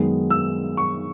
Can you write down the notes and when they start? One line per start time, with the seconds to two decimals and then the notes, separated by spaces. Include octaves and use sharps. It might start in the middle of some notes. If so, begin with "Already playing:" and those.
Already playing: F#2 D#3 G#3 B3
0.30 E6
0.77 C#6